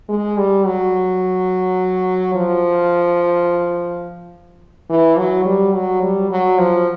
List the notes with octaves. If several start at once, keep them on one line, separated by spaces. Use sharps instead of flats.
G#3
G3
F#3
F3
E3
F#3
G3
F#3
G3
F#3
F3